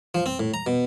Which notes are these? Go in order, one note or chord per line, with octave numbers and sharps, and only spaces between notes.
F3
C4
A2
A#5
B2